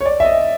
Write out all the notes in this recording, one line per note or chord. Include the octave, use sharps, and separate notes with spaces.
C#5
D5
E5
D#5